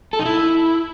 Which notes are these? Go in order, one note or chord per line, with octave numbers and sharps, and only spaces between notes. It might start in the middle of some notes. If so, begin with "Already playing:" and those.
A4
D#4
E4